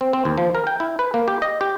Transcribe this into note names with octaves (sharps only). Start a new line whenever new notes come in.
C4
C4
D#2
F3
A#4
G5
E4
B4
A#3
G4
D#5
G4